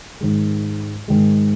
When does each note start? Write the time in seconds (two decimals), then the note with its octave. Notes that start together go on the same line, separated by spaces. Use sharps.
0.21 G#2 D#3 G#3
1.08 G#2 D#3 G#3